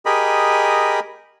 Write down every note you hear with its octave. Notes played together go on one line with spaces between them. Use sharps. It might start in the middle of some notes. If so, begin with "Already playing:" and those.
G4 G#4 A#4 D#5 B5